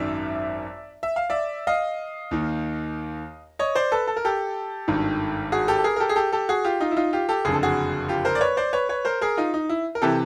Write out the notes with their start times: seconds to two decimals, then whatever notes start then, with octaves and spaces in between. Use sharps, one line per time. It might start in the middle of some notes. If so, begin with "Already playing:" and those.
Already playing: G#1 F#2 D#3 D5 E5
1.03 E5
1.16 F5
1.30 D5 E5
1.67 D#5 F5
2.31 D#2 D#3
3.59 C#5 D#5
3.75 C5 D5
3.92 A4 B4
4.07 A4
4.17 A#4
4.25 G4 A4
4.88 G#1 G2 D#3
5.52 F#4 G#4
5.68 G4 A4
5.78 A4
5.84 G#4 A#4
5.96 A#4
6.00 G4 A4
6.09 G#4
6.16 G4 A4
6.32 G4 A4
6.49 F#4 G#4
6.64 F4 G4
6.80 D#4 F4
6.91 E4
6.96 D#4 F4
7.13 F4 G4
7.29 G4 A4
7.45 F#1 F2 D3 G#4
7.54 A4
7.63 F#4 G#4
8.08 F4 G4
8.25 A#4 C5
8.35 D5
8.41 B4 C#5
8.57 C5 D5
8.73 B4 C#5
8.89 B4 C#5
9.05 A#4 C5
9.21 G#4 A#4
9.37 D#4 F4
9.54 D#4
9.69 E4
9.95 A#4
10.02 C3 E3 G4 A4